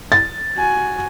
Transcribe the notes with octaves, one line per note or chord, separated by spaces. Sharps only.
A6
F#4 G#5